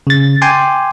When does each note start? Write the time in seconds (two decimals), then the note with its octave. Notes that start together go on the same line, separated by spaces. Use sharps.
0.07 C#3 A6
0.41 G5 G#5 C6 D6